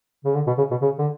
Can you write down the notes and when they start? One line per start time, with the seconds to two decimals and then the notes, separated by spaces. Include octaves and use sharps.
0.25 C#3
0.35 D3
0.47 B2
0.58 C#3
0.71 B2
0.82 C#3
0.98 D3